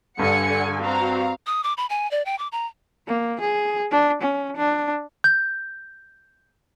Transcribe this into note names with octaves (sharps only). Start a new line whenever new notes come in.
G2 D3 F#5 G#5 C#7
C4 F#4 F5 A#5
D#6
D6
B5
G#5
D5
G5
D6
A#5
A#3
G#4
D4
C#4
D4
G6